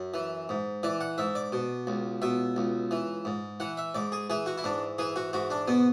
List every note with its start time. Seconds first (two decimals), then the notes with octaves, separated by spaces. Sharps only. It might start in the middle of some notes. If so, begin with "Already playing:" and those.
Already playing: F#2
0.14 E3
0.49 G#2
0.83 E3 D5
1.01 F#5
1.18 G#2 E5
1.35 D5
1.52 B2
1.87 C#2
2.22 B2 E5
2.56 C#2
2.91 E3
3.25 G#2
3.60 E3 F#5
3.77 E5
3.95 G#2 D5
4.12 G#4
4.30 E3 G#4
4.46 F#4
4.58 E4
4.64 G#2 D4
4.98 E3 G#4
5.16 F#4
5.33 G#2 F#4
5.50 D4
5.68 B2 B3